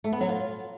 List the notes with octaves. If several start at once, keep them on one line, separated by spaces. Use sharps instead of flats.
A3
B3
F#3
F4